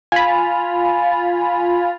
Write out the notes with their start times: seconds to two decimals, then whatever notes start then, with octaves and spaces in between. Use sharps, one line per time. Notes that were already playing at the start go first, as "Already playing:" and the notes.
0.12 F4 G#5 B5